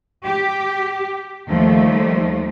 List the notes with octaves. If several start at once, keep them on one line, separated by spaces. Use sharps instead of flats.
G4
D#2 F3 G3 A3